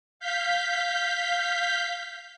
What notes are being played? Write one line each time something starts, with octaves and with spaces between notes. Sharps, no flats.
F5 G6 B6